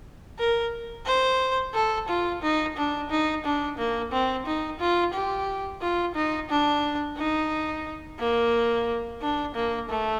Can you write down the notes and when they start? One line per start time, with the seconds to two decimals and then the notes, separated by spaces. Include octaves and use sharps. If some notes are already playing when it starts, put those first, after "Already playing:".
0.39 A#4
1.06 C5
1.74 A4
2.08 F4
2.42 D#4
2.77 D4
3.10 D#4
3.45 D4
3.78 A#3
4.12 C4
4.46 D#4
4.80 F4
5.14 G4
5.81 F4
6.15 D#4
6.50 D4
7.18 D#4
8.19 A#3
9.21 D4
9.55 A#3
9.89 A3